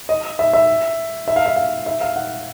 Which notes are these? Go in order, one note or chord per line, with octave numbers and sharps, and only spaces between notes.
D#5
E5
E5
E5
F5
E5
F5
E5
F5
F#5